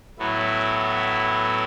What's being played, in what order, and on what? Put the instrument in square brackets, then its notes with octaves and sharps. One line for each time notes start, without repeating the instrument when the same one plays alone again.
[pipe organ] A2 F#3 B3 E4